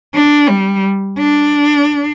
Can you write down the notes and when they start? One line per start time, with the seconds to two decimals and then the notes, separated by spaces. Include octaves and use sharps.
0.14 D4
0.49 G3
1.18 D4